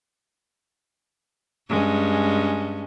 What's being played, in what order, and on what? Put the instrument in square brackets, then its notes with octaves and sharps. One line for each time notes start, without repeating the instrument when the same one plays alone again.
[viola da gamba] G2 G#3 C#4